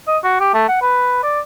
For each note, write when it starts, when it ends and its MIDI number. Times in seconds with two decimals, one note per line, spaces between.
0.07 0.18 75
0.24 0.39 66
0.40 0.53 67
0.54 0.64 57
0.69 0.79 78
0.81 1.21 71
1.23 1.40 74